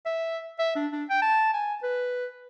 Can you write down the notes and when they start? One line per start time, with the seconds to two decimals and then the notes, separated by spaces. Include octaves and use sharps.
0.06 E5
0.59 E5
0.76 D4
0.92 D4
1.10 G5
1.22 A5
1.54 G#5
1.83 B4